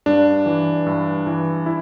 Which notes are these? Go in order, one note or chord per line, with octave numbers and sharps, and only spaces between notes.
G2 D4
E3
G2
E3
E4